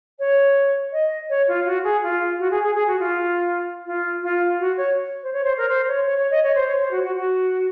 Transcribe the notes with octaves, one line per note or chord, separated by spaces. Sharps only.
C#5
D#5
C#5
F4
F#4
G#4
F4
F#4
G#4
G#4
G#4
F#4
F4
F4
F4
F#4
C#5
C5
C#5
C5
A#4
C5
C#5
C#5
C#5
D#5
C#5
C5
C#5
C5
F#4
F#4
F#4